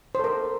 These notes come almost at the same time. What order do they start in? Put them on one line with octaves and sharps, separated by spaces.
C5 A4 A#4